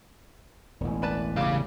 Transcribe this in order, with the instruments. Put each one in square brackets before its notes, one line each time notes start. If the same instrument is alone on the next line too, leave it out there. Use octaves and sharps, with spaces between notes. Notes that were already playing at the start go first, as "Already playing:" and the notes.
[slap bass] E1 A1
[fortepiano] D4 B4 A5
[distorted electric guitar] C#3 F5 [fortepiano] G3 D6